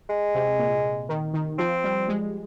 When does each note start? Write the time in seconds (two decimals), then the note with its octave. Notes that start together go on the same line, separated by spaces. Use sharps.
0.10 G#3
0.35 C3
0.59 A#2
1.09 D#3
1.34 D#3
1.59 F3 C4
1.84 G3
2.08 G#3